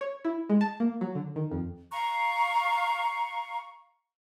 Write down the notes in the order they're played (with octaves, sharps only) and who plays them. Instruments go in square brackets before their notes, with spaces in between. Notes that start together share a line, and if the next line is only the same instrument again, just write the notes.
[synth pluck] C#5
E4
G#3
A5
A#3
F#3
D3
D#3
F2
[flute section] F5 A#5 C#6